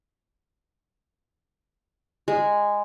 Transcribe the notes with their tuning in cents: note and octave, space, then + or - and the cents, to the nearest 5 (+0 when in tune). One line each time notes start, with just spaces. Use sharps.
G#3 -10